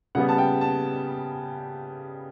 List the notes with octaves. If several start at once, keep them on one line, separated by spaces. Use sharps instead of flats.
C#3 G3 B3 F#5
A5
G5
A5